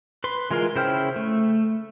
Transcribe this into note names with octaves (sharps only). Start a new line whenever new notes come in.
B4 C6
E3 G#3 F4 A#4 C6
C#3 E4 C5 G5 F6
A3